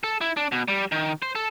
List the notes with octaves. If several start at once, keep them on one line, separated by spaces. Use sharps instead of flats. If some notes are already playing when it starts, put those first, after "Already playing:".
A4
E4
D4
B2
G3
D#3
C5
A4